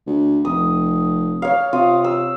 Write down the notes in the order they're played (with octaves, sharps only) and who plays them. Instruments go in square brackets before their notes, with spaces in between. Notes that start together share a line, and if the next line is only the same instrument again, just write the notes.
[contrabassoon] D2
[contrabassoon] F1 [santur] D#6
[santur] C#5 F5
[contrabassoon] C3 [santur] F4 D#6
[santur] E6